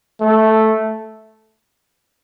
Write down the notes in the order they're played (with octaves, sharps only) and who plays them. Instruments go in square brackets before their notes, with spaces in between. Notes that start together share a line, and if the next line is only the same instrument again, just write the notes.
[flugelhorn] A3